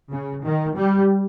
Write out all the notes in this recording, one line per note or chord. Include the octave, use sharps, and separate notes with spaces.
C#3
D#3
G3